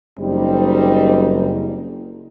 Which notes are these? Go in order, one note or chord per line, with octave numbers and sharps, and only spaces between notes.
F#1 G3 C4 D#4